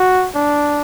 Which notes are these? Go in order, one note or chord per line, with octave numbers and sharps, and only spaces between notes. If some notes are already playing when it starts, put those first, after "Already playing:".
Already playing: F#4
D4